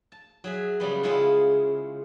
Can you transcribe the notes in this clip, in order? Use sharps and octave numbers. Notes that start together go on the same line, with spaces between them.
A5
F#3 G#4 E5
C#3 F#3 G3 B3
C#3 G#3 E4 F4